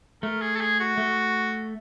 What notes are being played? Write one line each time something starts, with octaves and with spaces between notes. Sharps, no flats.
A3 A#4
G#4
A4
G#4
F#4
A3